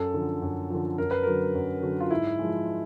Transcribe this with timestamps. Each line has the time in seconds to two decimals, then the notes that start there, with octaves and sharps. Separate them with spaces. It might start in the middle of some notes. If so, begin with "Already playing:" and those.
Already playing: F#2 A4
0.14 D3 F3
0.42 F#2
0.70 D3 F3
0.98 F#2 A#4
1.11 B4
1.23 D3 F#3 A#4
1.54 F#2
1.83 D3 F#3
2.00 F4
2.11 G#2 E4
2.39 F3 G#3